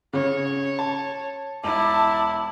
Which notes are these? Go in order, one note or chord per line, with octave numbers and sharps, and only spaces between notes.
C#3 C#5
A5
E1 E4 A5 D6